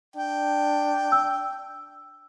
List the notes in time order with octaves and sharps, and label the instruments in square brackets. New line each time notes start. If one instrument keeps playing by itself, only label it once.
[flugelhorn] D4 [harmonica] G5
[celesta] E6